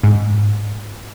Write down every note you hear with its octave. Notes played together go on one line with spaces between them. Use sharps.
G#2